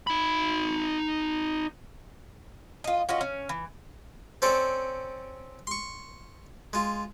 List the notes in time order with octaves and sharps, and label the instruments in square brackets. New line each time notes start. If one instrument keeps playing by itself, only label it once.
[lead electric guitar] D#4 B5
[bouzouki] F4 D#5
C#4 D#4 F4 F#4
C#4
E3
[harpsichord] C4 C#4 A4 C5 D5
C6 C#6
G#3 F4